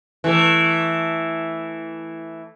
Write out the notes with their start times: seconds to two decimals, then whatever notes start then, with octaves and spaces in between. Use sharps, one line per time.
0.24 E3 A3